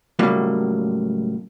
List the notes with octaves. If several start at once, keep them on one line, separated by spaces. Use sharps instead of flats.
C#2 A2 F#3 G3 A#3